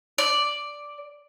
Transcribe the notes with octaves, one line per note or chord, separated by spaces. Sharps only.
D5